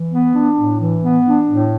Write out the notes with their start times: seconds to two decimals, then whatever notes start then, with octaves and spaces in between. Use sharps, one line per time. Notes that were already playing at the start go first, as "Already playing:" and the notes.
Already playing: E3
0.12 B3
0.35 D4
0.58 A2
0.80 E3
1.03 B3
1.26 D4
1.48 A2